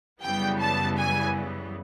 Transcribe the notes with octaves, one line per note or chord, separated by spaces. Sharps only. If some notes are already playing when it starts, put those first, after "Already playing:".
F#2 C#3 E3 G3 B3 G5
A5
G#5